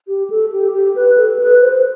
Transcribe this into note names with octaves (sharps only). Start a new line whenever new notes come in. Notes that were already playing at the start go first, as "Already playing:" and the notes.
G4
A4
G4
G4
B4
A4
B4
C5